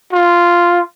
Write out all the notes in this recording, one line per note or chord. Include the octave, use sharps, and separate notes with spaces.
F4